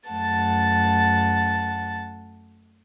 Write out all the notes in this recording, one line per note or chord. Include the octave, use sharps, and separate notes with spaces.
F#2 A3 F#5 A5 A6